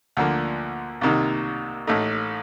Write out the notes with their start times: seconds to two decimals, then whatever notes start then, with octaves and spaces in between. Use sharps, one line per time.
0.17 D2 D3 F3 A#3
1.01 C2 C3 D#3 A#3 D#4
1.87 A1 A2 A3 D#4